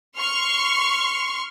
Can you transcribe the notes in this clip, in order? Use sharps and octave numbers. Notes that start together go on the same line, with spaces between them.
C6 C#6 F6